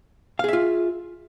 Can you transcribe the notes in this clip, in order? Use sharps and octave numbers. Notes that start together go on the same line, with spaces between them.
F4 G#4 E5 F5